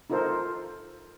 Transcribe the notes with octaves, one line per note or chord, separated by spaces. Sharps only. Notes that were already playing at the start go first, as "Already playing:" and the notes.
D#4 F4 A4 A#4 C5